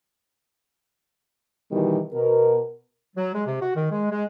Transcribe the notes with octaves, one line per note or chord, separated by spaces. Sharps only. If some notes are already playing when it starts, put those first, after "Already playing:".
B2 D#3 E3 G3
B2 A#4
F#3
G#3
C3
F#4
D#3
G#3
G#3